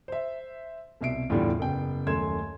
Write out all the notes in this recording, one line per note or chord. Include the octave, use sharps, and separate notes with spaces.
C5 E5
C2 B2 E5 C7 D7
E2 A2 D3 G3 F4
F#1 B3 G5
D#1 F#2 A3 C6 G#6 E7